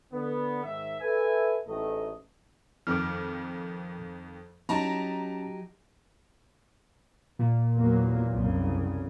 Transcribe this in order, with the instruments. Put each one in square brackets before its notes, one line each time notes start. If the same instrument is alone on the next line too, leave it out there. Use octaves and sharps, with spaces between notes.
[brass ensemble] D3 B3
G#2 D#3 E5
A4 B4 E5 G#5
A1 G#2 A3 D#5
[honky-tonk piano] F2 D#3 [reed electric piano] D6 F6
[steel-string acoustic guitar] F#3 D#4 G4 [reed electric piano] C#4 [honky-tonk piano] A5 A#5
[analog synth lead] A#2
[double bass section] E2 F#3 A#3
C2 F#2 C#3